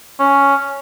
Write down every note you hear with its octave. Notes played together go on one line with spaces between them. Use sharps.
C#4